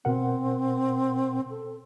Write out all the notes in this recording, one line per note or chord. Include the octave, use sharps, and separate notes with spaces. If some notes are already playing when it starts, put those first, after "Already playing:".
B2 C4 A#4 F#5
A4